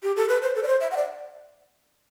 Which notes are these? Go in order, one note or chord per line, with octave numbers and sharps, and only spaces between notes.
G4
A4
B4
C5
A4
D5
C5
E5
F#5
D5